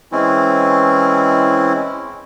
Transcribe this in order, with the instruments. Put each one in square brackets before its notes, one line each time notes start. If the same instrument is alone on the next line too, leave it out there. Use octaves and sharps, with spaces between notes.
[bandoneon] E3 G#3 C4 C#4 E4